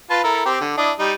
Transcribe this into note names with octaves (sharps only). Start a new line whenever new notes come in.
F4 B4 A5
E4 A4 A#4
C4 G4
D3
D4 E4 D#5
G3 D#4